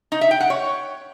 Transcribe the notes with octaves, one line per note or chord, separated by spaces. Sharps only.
D#4
E5
G5
F#5
C#5